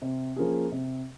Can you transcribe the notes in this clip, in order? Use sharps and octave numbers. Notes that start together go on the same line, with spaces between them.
C3
F3 A#3 C#4 G#4
C3